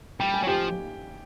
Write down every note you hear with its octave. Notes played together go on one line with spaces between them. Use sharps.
G3 G5
G#5
F#3
F3 G4 G5